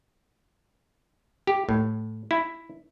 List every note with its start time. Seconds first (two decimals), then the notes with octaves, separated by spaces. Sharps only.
1.47 G4
1.69 A2
2.31 E4